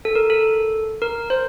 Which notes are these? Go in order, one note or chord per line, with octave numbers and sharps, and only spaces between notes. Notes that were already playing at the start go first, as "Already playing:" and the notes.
A4
A#4
A4
A#4
C5